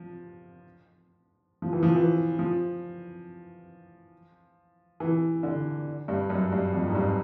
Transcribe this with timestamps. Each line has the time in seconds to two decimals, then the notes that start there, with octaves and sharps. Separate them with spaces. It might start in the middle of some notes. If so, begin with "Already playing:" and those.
Already playing: F3
1.62 F3
1.73 E3
1.83 F3
1.96 E3
2.39 F3
5.00 E3
5.43 D3
6.08 G2
6.30 F#2
6.52 G2
6.74 F2
6.88 G#2
6.95 G2